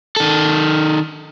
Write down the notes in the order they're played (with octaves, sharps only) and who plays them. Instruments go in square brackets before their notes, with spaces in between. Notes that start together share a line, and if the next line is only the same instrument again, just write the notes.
[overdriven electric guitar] D#3 A4